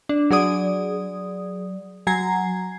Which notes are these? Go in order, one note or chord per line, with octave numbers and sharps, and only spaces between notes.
D4
F#3 G#4 D5 D#6
F#3 G#5 A#5 G#6 C7